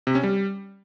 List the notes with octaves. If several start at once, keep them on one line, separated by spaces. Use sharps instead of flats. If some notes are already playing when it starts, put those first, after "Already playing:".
C3
C#4
G3